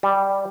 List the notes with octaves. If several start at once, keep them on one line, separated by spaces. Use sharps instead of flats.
G3